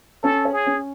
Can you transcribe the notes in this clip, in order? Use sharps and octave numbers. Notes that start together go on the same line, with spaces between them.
C#4 A4
C#5
G#4
C#4